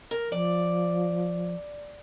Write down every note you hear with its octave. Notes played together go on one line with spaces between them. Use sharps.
A#4
F3 D5